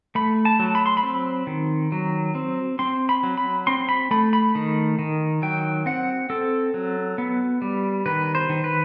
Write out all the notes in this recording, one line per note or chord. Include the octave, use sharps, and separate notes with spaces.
A3 B5
A5
F#3
B5
C6
B5
C4
D#3
F#3
C4
C4 C6
B5
F#3
B5
C4 C6
B5
A3 B5
B5
D#3
D#3
F#3 G5
C4 F#5
C4 A4
F#3
B3
G3
D#3 B4
C5
D#3
B4